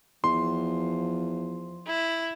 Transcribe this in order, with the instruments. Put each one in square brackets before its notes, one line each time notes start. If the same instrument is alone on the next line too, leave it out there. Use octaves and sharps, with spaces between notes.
[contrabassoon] E2 [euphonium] F3 [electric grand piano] C6
[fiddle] E4